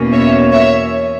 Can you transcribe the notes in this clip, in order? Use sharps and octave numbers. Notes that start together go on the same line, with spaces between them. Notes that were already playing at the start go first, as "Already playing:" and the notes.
Already playing: E2 B2 A#3 C#4
C#5 E5
C#5 E5